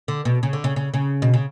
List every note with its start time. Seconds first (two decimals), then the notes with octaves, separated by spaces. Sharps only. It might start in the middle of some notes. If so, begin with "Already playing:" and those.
0.08 D3
0.25 B2
0.43 C#3
0.53 D3
0.64 C#3
0.76 C#3
0.94 C#3
1.22 B2
1.34 C#3